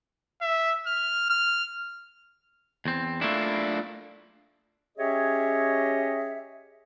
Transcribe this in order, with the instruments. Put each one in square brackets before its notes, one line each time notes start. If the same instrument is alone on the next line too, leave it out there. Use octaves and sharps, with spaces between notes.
[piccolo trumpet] E5
F6
F6
[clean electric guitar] E2 C4
[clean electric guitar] A3 A#3 E4 [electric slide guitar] D4 F4
[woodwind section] C#4 G4 G#4 C#5 D#5 E5